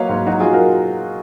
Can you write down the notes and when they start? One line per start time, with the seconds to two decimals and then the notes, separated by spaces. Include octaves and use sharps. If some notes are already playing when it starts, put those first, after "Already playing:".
Already playing: F#3 A#3 B4 C#5 D#5 F5
0.09 G#2
0.27 F#3 D#4 F#4
0.40 F#3 F4 G#4
0.53 F#4 A#4